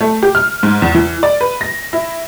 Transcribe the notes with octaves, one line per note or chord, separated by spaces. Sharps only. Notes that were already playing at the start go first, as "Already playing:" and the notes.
A3
G4
F6
G#2
E2
E3
D5
B4
A#6
E4